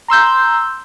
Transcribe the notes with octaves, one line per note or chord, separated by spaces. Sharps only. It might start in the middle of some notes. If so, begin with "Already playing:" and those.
A#5 C6 E6 G6